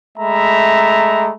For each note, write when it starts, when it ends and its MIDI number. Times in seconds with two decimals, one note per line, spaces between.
0.18 1.32 56
0.18 1.32 57
0.18 1.32 76
0.18 1.32 82
0.18 1.32 83